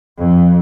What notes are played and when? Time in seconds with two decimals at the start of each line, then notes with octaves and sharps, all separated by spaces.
0.18 F2